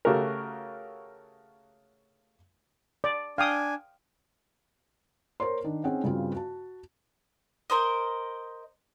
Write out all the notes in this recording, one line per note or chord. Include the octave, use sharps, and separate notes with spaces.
C#3 A3 F#4 G4 A#4
D5
D4 F5 G5 G#5 D#6
A#4 C5 C#5 C6
D#3 D4
C4 C#4 D#4 G#4 F#5
G2 C#3 C4 F4 F#4
F#4 A5
A#4 C5 D#5